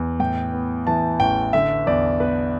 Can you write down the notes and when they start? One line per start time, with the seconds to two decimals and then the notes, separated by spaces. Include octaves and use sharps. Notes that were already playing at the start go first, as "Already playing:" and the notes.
Already playing: E2
0.20 A2 G5
0.53 B3
0.87 E3 A5
1.20 A1 G5
1.53 D3 E5
1.87 E2 D5
2.20 B3 B4